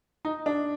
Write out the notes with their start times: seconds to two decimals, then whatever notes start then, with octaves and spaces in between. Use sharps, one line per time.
0.25 D#4
0.46 D4